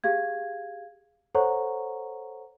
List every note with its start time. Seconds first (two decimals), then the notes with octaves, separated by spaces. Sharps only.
0.04 G4 G#4 F5 G#6
1.35 A4 C5 C#5 F#5 A#5 C#6